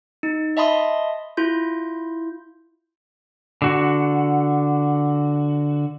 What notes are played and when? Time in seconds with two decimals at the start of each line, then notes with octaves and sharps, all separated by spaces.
0.23 D#4
0.57 D#5 E5 A5 B5 C6 D#6
1.37 E4 F4 G6
3.62 D3 F#4